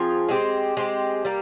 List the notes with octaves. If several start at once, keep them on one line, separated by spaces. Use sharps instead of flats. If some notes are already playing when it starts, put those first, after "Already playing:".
Already playing: F3 C4 F4 G#4
G#3 C4 G4
G#3 C4 G4
G3 A#3